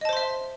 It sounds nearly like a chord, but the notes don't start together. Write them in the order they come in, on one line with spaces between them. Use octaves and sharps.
D#5 A5 C5 C6 E5